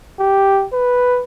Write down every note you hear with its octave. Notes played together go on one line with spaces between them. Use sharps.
G4
B4